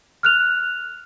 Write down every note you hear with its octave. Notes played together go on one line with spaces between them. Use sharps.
F6 F#6 F7